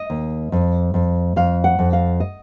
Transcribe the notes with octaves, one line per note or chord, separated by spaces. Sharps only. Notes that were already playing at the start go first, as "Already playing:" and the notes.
Already playing: D#5
D#2
F2
F2
F2 F5
F#5
F2
F5
D#5